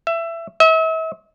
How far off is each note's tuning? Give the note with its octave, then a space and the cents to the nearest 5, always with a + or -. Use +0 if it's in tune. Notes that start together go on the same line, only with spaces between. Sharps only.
E5 +20
E5 -40